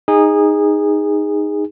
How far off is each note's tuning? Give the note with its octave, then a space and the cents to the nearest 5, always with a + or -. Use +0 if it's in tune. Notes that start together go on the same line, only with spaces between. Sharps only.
D#4 +0 G#4 -20